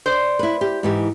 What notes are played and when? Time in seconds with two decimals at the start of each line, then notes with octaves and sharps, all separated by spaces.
0.06 C5 D5
0.39 E4 B4
0.61 G4
0.83 G#2 E3 G4